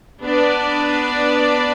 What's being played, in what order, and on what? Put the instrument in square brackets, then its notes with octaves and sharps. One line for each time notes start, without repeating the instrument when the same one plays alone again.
[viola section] B3 D4 B4 D5